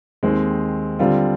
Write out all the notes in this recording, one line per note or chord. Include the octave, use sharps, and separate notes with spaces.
D#2 D#3 G#3 C4
D3 G3 C4 F4